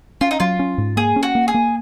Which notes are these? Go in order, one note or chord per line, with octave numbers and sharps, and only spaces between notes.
C#4 F4
D#4
F#3 F4
C#4
G#2
A#3 G#4
C#4
F#4
A#3
G#4
A#3